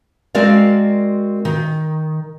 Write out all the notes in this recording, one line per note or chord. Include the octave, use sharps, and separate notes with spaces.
G#3 C4 F#4 A#4 D5 F5
D#3